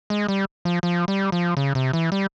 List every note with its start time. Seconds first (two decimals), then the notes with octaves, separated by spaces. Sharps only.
0.10 G#3
0.28 G3
0.65 F3
0.83 F3
1.08 G3
1.32 F3
1.57 C#3
1.75 C3
1.93 E3
2.12 G3